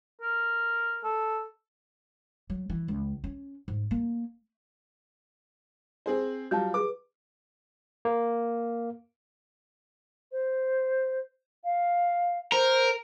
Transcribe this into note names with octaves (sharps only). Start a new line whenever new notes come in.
A#4
A4
F#3
E3
C#2
C#4
G#2
A#3
C4 G#4 C5
F#3 G3 F4 A5 G6
G#4 B4 D6
A#3
C5
F5
A#4 C5